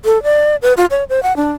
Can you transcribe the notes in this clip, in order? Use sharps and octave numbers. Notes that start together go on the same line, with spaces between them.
A4
D5
B4
F4
C#5
C5
F#5
D4